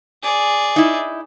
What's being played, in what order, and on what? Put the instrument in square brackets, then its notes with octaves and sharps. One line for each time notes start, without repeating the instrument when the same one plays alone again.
[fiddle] G#4 D5
[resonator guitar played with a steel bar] D#4 E4